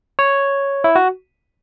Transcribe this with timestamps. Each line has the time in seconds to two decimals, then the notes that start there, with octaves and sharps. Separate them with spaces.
0.19 C#5
0.84 E4
0.96 F#4